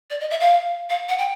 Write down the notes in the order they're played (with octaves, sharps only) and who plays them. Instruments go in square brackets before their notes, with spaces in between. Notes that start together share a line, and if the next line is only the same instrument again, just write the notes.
[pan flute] D5
D#5
E5
F5
F5
F#5
G5